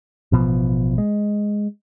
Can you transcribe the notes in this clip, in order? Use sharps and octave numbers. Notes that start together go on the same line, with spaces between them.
A1 B2 F3
G#3